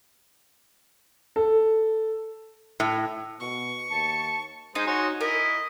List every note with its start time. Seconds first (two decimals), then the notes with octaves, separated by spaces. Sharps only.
1.36 A4
2.80 A2
3.40 B2 C#6
3.90 D#2 A5 C#7
4.75 G#3 D#4 C5 D#6
4.87 F#4 C#5 G#5 C6
5.21 E4 A#4 D#5